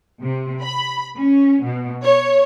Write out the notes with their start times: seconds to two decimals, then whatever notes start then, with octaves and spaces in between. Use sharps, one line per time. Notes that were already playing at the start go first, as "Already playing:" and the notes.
0.21 C3
0.62 B5
1.18 C#4
1.62 B2
2.04 C#5